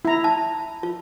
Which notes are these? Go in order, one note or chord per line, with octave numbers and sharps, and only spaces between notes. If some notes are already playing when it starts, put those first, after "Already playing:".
E4 A#5
A5
F4